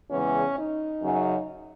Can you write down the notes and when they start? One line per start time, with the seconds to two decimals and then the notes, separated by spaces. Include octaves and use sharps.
0.10 E2 C#3 E3 G#3 C#4
0.57 D#4
1.03 F#2 C#3 F#3